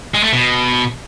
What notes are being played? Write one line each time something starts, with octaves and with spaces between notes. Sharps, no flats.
G#3
A3
B2